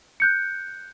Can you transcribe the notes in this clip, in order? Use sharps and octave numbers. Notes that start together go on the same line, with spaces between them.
F#6 G6 C#7